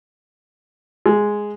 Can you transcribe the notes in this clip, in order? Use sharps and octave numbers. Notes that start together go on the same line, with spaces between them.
G#3